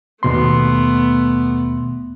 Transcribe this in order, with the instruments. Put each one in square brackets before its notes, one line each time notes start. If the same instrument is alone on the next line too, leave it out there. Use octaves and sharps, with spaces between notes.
[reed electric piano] D#2 B2 C6 [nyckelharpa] A3 B3